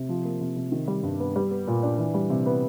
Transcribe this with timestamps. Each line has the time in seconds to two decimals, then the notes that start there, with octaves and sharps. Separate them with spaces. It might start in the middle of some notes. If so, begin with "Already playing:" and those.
Already playing: C3
0.09 F3
0.25 A#3
0.41 C3
0.56 C3
0.72 D#3
0.88 G3
1.03 G2
1.20 B3
1.36 G3
1.51 B3
1.67 A#2
1.83 D4
1.98 E3
2.14 G3
2.30 C3
2.46 B3